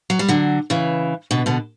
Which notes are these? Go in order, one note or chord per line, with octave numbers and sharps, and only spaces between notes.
F#3
G3
D3 F#3
C#3 E3
B2 D3
B2 D3